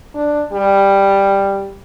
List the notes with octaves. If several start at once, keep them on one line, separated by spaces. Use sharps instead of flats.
D4
G3